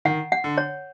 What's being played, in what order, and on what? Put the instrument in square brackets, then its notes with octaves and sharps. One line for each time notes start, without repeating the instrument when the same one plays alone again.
[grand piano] D#3 [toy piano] F#5
[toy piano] F#5
[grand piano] D3
[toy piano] C#5